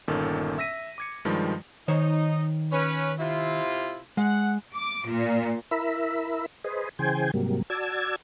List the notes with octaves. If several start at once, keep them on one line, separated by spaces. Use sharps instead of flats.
G1 A#2 D#3 C#4 A4 A5
E5 E6 A#6 B6 D#7
D6 G#6 C#7
G2 D#3 F3 G3 G#3
D#3 D#4 C5 C#5
C#4 B4
C3 E4 F4
G#3 F#5
D6
A#2
E4 A#4 E5 B5
G#4 B4 C5 D#5
C#3 E3 G#4 C5 G5 G#5
G#2 C3 F#3 G3 A#3
F#4 D5 A5 E6 G#6